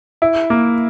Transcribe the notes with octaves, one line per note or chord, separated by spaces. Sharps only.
E4
A#3